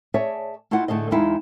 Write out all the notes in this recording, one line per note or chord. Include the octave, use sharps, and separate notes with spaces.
G#4 C#5 D5 E5 G#5 A5
A3 E4 F4 D#5 F#5
A2 D3 A3 G#4 D#5
E2 G#3 D#4 E4 F5 G5